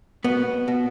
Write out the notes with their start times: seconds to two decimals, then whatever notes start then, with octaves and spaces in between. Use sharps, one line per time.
0.24 B2 B3
0.68 B2